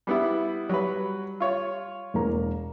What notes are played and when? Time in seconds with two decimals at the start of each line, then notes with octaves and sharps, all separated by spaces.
0.07 G3 B3 E4
0.69 F#3 G3 B4
1.40 F4 C#5
2.14 E1 A#3 A#5